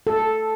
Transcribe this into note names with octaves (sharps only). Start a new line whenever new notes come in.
A4